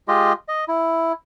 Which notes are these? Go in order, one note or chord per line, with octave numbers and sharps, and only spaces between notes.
G#3 F4 G4 D#5
D#5
E4